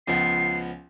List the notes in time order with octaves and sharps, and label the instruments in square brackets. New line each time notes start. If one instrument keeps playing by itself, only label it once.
[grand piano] C#2 F3 B3 [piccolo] C7